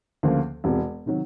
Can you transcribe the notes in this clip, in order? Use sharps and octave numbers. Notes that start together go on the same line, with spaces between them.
D2 C#3 F3 A#3
E1 E2 C3
C3 D#3 F#3